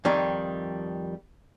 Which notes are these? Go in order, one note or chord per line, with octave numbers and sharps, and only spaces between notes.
F2 D#3 G3 D#4